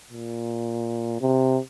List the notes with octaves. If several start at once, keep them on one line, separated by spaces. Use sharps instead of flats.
A#2
C3